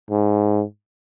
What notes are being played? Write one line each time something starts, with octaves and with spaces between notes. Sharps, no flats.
G#2